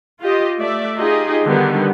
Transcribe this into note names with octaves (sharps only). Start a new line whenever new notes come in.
F4 G4 D#5
A3 D5 E5
D#4 F4 G4 G#4 D#5
D3 D#3 G3 B3